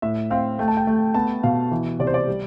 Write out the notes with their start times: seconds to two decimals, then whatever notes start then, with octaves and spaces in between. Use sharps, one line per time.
0.02 A2 E5
0.31 C4 F5
0.59 A3 G5
0.68 A5
0.77 G5
0.87 A3
1.14 B3 A5
1.43 B2 F5
1.71 E3
1.99 C3 D5
2.07 C5
2.14 D5
2.27 G3